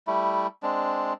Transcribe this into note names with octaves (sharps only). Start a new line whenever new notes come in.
G3 A3 E4
G#3 C4 D4